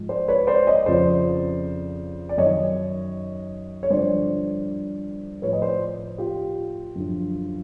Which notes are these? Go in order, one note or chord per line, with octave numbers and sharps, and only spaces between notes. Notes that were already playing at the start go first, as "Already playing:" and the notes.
Already playing: G#2 F3
C5 D5
B4 C#5
C5 D5
C#5 D#5
F2 C#3 F3 C5 D5
D5
F#2 D#3 C#5 D#5
C#5
G2 D3 F3 C5 D5
A2 F3 B4 C#5
D#5
C5 D5
F4 G4
F#2 D3 F3